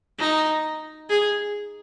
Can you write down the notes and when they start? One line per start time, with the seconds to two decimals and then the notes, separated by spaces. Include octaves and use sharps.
0.19 D#4
1.10 G#4